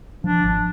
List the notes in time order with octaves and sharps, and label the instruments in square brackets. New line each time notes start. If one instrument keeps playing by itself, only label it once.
[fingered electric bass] F3 [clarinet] D4
[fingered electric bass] G#1